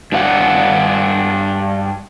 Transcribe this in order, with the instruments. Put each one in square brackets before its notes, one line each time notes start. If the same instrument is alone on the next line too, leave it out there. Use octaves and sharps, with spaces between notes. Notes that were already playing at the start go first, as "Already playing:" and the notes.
[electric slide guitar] G2 D4 F5 F#5